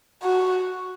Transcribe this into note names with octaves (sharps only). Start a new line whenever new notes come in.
F#4